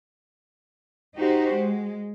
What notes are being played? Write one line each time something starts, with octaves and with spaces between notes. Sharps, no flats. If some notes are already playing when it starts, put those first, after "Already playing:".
D#4 F#4 G4 C5
G#3